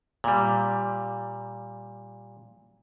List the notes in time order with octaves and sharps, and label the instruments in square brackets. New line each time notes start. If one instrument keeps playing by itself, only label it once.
[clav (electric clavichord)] A#2 G3